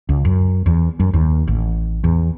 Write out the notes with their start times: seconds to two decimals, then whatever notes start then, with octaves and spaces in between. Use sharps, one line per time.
0.09 C#2
0.25 F#2
0.66 E2
1.00 F#2
1.14 D#2
1.48 A1
2.04 E2